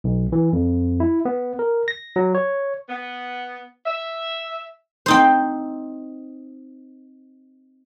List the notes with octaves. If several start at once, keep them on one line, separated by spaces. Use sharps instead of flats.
B1
E3
F2
E4
B3
A#4
A#6
F#3
C#5
B3
E5
C4 D#4 C5